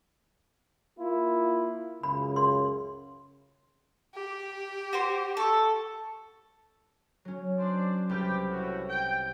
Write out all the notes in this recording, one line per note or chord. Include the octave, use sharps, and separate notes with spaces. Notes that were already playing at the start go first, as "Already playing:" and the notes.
A#3 E4 F4
C#2 F#2 C#3 B5
C6
G4
F#4 C5 C6
A4 C#6
F#3 C#4
D4 C5 D5
C2 G4 B4 G5 F6
A2 F#4
G5